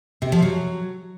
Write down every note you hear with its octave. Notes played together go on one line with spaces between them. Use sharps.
C3
F3
F#3